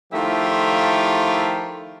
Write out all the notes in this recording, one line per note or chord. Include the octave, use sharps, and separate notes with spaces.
D#3 F3 A3 E4 F4 G4